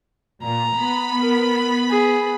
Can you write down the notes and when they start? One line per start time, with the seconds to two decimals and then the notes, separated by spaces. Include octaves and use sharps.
0.43 A#2 A#5
0.77 B3 B5
1.21 A#4
1.89 G#4